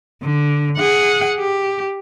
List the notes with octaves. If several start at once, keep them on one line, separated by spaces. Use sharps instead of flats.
D3
G#4 F#5
G4